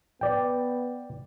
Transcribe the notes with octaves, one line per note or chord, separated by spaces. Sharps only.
B3 D5 G5